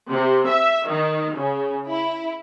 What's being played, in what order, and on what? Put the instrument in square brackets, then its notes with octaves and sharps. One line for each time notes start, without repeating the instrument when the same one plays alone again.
[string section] C3
E5
D#3
C#3
E4